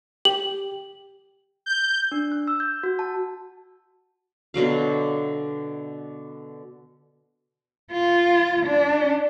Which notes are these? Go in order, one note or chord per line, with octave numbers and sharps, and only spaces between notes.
G4 F#7
G6
D4
F#6
E6
G6
F#4
A5
B2 D3 F#3 F5
F4
D4